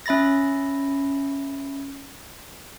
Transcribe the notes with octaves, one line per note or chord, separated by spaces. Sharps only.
C#4 E5 B5 A6 A#6